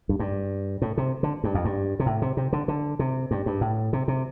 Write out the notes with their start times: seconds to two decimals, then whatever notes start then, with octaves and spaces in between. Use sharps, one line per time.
0.09 G2
0.20 G2
0.82 A2
0.97 C3
1.23 D3
1.44 G2
1.55 F2
1.65 G2
2.00 C3
2.06 A2
2.22 C3
2.37 C3
2.53 D3
2.68 D3
2.99 C3
3.31 G2
3.46 G2
3.61 A2
3.93 C3
4.08 C3